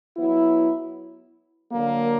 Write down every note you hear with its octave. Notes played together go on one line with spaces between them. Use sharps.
F#3 B3 E4
D3 F#3 A#3